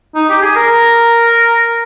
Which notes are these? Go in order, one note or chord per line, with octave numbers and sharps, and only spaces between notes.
D#4
G4
G#4
A#4